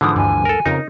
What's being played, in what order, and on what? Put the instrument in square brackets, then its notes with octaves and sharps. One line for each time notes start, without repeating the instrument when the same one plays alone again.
[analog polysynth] G#2 [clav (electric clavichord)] D3 E3 F3 [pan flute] D#6
[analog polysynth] D2 G2 [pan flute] G#5
[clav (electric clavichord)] A4 A#4
[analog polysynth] F2 C#3 A#4 [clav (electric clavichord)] D#4